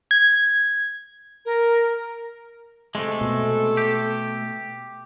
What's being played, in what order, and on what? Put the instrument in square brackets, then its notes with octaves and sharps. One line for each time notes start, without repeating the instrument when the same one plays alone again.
[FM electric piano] G#6
[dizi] A#4
[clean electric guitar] C3 G#3 [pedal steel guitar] A3 [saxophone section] A4
[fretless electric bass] B2
[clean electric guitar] G4